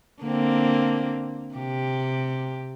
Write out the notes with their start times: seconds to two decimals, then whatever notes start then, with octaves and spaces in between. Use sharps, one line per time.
0.22 D3 A#3 C4
1.54 C3 G4